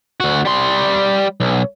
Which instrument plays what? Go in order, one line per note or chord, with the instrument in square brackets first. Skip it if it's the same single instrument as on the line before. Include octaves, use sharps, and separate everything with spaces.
[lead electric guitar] D2 F#4
G3 C6
B1